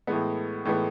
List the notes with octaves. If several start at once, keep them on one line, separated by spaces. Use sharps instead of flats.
A2 E3 G#3 B3
A2 E3 G#3 B3